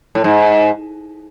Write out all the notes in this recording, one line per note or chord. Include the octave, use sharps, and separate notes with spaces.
A2
G#2